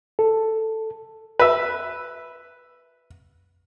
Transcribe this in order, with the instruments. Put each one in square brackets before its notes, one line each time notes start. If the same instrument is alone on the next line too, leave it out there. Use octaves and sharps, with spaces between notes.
[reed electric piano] A4
[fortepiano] B4 E5